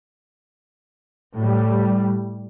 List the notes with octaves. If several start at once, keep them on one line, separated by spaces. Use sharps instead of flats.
A2 G3